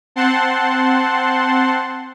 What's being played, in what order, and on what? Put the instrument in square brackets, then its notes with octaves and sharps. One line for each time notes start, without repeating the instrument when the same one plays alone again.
[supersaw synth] C4 F#5 A5 C6